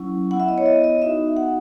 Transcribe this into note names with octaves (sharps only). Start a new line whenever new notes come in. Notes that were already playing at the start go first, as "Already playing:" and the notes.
Already playing: F#3 C#4 E4
B3 E4 F#5
E5
D#5
C#5
D#5
D#5
B3 D#4 F#4 E5
F#5